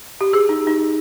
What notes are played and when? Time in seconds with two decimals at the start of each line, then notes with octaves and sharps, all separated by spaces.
0.21 G4
0.33 G#4
0.49 D#4
0.67 D#4